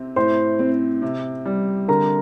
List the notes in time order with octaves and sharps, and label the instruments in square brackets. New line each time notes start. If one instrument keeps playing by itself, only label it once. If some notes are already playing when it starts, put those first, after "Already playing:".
Already playing: [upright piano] C3 C4
[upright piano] A2 [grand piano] C5 C6
[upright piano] C4
C3
G3
[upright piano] D3 [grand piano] A#4 A#5